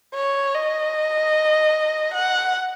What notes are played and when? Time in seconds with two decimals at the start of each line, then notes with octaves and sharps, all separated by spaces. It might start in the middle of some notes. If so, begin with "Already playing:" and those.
0.14 C#5
0.54 D#5
2.14 F#5